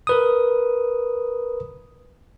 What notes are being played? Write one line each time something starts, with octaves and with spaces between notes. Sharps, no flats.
A#4 B4 D#6